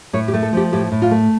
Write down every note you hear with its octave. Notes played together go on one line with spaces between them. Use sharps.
A2 C#5
G4
A3
A4
F3 G4
A2 G4
A2
F4
A3